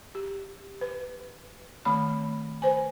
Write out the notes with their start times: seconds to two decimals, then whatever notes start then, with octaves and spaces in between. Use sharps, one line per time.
0.15 G4
0.81 B4
1.85 D#3 A3 C4 B5
2.62 B4 C5 G#5